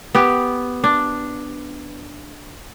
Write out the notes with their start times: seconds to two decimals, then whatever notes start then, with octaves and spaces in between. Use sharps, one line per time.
0.15 B3 G4
0.84 D4